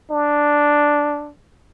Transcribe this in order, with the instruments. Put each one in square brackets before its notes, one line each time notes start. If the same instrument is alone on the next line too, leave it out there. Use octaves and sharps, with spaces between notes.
[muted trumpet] D4